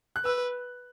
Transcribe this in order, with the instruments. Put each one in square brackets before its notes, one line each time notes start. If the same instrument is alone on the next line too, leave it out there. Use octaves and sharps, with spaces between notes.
[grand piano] F#6
[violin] B4 [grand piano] E6